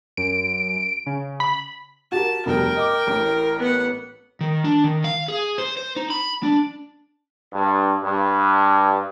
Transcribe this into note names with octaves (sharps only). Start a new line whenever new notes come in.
F#2 D7
C#3
B5
F#4 G4 A#4 A5
F1 G2 B2 A#4 G5
D#5 D6
A1 A2
B3 F#5
D#3
D4
D#3
F5
G#4
C5
C5
D#4
B5
D4
G2
G2